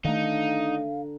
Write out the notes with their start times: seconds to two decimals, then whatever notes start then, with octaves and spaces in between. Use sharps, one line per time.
0.05 D3 D#3 A3 D#4 F5 F#5 A#5